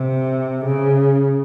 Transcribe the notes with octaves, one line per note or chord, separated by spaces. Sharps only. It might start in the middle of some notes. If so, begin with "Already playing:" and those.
Already playing: C3
C#3